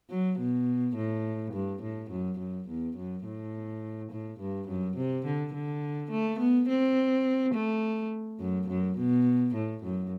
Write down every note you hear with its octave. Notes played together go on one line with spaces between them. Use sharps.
F#3
B2
A2
G2
A2
F#2
F#2
E2
F#2
A2
A2
G2
F#2
C3
D3
D3
A3
B3
C4
A3
F#2
F#2
B2
A2
F#2